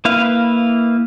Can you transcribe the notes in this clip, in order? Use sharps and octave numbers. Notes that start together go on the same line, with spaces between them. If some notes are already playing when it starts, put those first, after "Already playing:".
A#3 E4 B4 F5